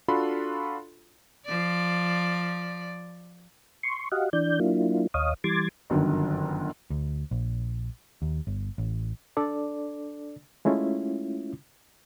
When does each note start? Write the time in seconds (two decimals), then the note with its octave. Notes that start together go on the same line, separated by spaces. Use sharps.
0.08 D4 F4 F#4 A4 B5 C6
1.46 F3 D5
3.83 C6 C#6
4.12 F#4 G4 D#5 F5 F#5
4.33 E3 D4 D5 G6
4.60 F#3 A#3 D4 E4 F4
5.14 D#2 C#5 D#5 F5 D#6
5.44 E3 G3 C6 D6 G#6 A6
5.90 G1 F#2 D3 D#3
6.90 D2
7.31 A#1
8.22 D#2
8.47 G1
8.78 A1
9.37 D4 A4 D5
10.65 G#3 A3 C#4 E4 F4